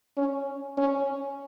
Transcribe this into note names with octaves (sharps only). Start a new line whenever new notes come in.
C#4
C#4